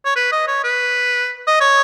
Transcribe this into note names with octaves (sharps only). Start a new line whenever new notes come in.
C#5
B4
D#5
C#5
B4
D#5
C#5